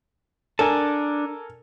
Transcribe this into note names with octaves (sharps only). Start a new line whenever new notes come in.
D4 A4 A#4 G#5 A5